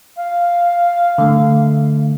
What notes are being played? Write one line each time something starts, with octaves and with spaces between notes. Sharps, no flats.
F5
D3 A3